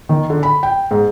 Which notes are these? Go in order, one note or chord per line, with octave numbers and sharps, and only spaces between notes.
D#3
D3
B5
G5
G#2